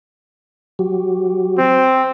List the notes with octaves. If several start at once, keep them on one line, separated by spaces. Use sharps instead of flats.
F#3 F#4 G4
C4